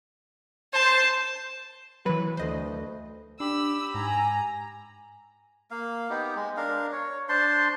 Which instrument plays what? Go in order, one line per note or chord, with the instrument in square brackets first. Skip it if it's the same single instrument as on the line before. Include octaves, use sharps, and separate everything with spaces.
[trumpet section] C5 [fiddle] A5
[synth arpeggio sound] E3 F#3 [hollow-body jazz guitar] B4
[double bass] D2 [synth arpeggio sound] C5 D#5
[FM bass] D4 [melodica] G4 B5 [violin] E6
[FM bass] G#2 [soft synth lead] G#5 [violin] A#5
[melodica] A#3 F5
B3 D#4 G4
G#3
D4 A#4 F5
C#5
D4 C5 A5 C6